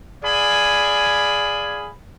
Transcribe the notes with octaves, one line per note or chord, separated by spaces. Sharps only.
G#4 D5 F5 G#5 B5